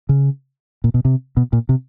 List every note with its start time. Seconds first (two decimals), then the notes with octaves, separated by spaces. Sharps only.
0.09 C#3
0.84 A#2
0.94 B2
1.05 C3
1.37 B2
1.53 A#2
1.69 C3